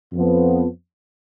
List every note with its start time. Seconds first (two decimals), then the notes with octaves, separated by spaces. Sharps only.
0.12 F2 F3 B3